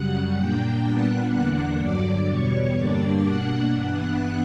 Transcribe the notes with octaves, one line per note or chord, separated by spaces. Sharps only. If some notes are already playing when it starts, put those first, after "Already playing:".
Already playing: F#2 C#3 G3 F#5 F#6
A#2 A#3 D4 G5 G6
A#2 G3 B3 D4 F#5 F#6
E2 D3 A#3 D4 F#5 F#6
G2 D3 F#3 D5 D6
E2 B2 G3 C#5 C#6
G2 D3 G3 A#3 D4 D5 D6
B2 A#3 D4 F#5 F#6
G2 E3 B3 D4 F#5 F#6